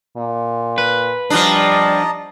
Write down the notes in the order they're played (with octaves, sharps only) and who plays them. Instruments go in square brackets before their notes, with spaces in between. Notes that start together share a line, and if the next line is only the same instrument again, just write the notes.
[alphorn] A#2
[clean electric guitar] B4
[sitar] F3 D4 [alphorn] G3 [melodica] D#5 A5 A#5